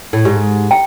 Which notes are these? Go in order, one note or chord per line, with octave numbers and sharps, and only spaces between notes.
A2
G#2 G4
G5 A#5